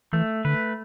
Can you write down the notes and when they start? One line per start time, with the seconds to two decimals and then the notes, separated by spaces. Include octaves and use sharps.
0.13 E3 A3
0.45 D3 B4